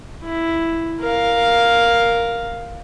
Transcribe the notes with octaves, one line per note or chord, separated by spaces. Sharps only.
E4
A#4 F5